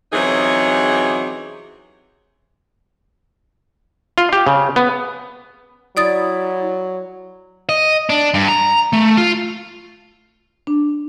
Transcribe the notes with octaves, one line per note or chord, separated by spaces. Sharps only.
F#2 C3 E3 F#3 D#4 G#4
F4
G4
C#3
B3
F#3 E4 D5 D#6 A6
D#5
D4
G2
A#5
A3
F4
D4